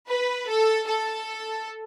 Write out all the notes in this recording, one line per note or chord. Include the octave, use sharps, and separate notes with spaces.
B4
A4
A4